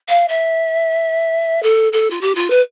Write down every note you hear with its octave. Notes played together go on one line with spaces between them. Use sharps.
F5
E5
A4
A4
F4
G4
F4
B4